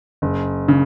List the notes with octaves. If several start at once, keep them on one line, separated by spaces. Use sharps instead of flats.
F#1
C#3